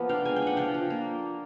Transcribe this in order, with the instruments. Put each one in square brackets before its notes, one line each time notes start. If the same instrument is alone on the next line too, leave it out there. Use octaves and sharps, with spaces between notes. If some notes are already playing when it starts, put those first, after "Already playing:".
Already playing: [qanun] F3 A#3 B3
D4 F5 G5
G#3 G#5
G5
D4 F#5
F3 F5 G5
F3
A#3